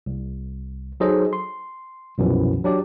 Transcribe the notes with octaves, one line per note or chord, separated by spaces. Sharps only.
C2
F#3 D#4 G#4 A4 C5 D#5
C6
C2 F#2 B2 E3 F3
F#3 D4 G4 D5